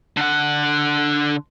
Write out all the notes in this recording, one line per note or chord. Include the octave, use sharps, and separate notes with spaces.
D3 F#5